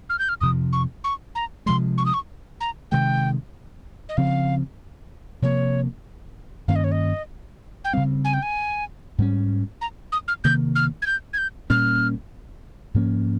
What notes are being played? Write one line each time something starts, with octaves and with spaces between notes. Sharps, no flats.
F6
G6
F6
F2 C3 F3 D#6
C#6
C#6
A#5
C3 F3 G#3 C6
C#6
D#6
C#6
A#5
C3 D#3 G#3 G5
D#5
C#3 F3 C4 F5
C3 F3 A#3 C#5
G2 D#3 A#3 C#4 F5
D#5
C#5
D#5
G5
C#3 G3 C4 F5
G#5
G5
G#5
G#2 G3 C#4
A#5
D#6
F6
C3 D#3 A#3 G6
F6
G#6
G6
G#6
G6
A#2 G3 A#3 C#4 F6
G#2 F3 A#3 C#4